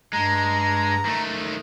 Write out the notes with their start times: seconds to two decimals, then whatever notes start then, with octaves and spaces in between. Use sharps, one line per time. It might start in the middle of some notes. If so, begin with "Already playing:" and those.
0.13 G2 G#3 A#5
1.06 D#3 A3